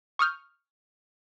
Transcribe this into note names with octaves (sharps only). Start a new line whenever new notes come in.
C#6 D#6 F6 G6